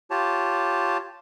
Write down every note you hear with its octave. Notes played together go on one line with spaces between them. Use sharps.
F4 G4 C#5 A5